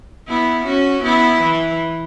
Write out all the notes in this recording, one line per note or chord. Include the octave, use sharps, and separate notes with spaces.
B3 E4
C#4 F#4
B3 E4
E3